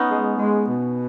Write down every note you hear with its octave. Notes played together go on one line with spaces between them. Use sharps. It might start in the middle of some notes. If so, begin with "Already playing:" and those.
Already playing: B3 C#4 D#4
G#3
G#3
B2